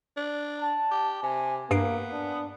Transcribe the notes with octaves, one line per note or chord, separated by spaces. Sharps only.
D4
A5
G4
C3 G#5
G2 A#3 B3 C7 D7
D4